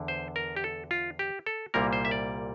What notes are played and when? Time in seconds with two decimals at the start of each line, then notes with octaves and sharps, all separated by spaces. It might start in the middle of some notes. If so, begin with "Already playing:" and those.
Already playing: E2 D3
0.08 C5
0.36 A#4
0.56 G4
0.64 A4
0.91 F4
1.19 G4
1.46 A4
1.74 C2 A#2 G3 A#3 A#4
1.93 C5
2.05 E5
2.11 D5